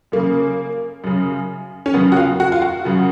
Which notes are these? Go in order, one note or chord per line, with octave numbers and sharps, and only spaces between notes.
F#2 C#3 A#3
F#2 C#3
C#4
F#2 C#3 B3
F#4
F4
F#4
F4
F#4
F#2 C#3